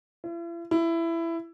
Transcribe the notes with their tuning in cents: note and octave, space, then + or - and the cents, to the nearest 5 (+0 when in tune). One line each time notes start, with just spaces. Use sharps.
E4 +45
E4 +15